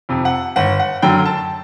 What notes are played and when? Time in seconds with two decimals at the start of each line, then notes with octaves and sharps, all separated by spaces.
0.09 F2 C3
0.25 F#5
0.56 G1 F#5
0.79 F#5
1.02 F#2 D3 F#3 G5
1.25 A5